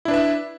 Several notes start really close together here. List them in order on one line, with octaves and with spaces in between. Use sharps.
E4 D4 B4 E5